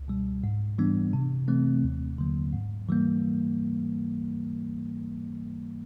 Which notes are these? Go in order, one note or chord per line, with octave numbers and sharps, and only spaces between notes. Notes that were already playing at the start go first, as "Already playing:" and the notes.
Already playing: C#2
B2 G3
G#2
E3 G3 B3 D4
C3
E3 A3 C4
D#2
D3 F#3 A#3
G#2
E3 G3 A#3